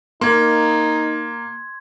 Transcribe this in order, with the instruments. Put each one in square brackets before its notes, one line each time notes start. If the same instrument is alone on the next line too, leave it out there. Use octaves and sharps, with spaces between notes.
[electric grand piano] A#3 [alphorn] D#4 [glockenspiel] C6 G#6